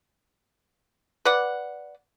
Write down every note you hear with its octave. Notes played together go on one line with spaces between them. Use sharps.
B4 D5 F#5